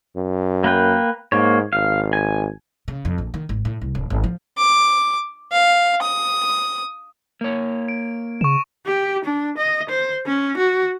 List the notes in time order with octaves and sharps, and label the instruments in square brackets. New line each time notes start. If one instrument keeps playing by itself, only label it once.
[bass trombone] F#2
[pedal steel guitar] A#3 B4 G5
[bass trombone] G#2 [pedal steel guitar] A#3 C#5
[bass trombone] G#1 [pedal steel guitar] F5
[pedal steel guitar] G#5
[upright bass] C#3
F2
A#1
D#3
G#1
A2
C2
D1
G#1
F3
[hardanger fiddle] D6
F5
D#6
[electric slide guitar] A#3 C#5
[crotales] D7
[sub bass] C#3 [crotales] C#6 E7
[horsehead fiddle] G4
D4
D#5
C5
C#4
F#4